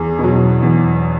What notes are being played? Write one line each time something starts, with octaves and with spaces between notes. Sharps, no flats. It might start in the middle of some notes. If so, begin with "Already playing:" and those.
Already playing: E2 G#4
B2 F#3
E2